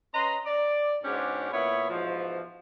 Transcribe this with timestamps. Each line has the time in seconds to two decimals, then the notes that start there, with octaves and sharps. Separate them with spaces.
0.13 C#4 B4 D#5 A#5 C6
0.46 D5
1.03 G#2 B2 G#3 C#4 D4 G4
1.51 A#2 B3 E4 C#5 B5
1.89 G#2 B2 E3 F3